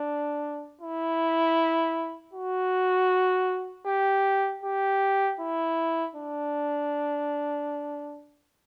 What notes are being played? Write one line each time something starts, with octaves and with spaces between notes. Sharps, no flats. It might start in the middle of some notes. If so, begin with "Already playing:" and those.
Already playing: D4
E4
F#4
G4
G4
E4
D4